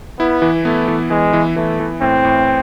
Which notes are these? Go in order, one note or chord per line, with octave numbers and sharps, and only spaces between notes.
B3 E4
E3
A3 B3
E3
E3 G#3
E3
E3 A3
E3
A2 C4
A2